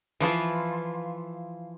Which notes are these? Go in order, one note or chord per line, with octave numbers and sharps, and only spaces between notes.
E3 F3 E4 F4